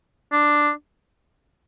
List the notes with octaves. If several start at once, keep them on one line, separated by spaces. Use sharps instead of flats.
D4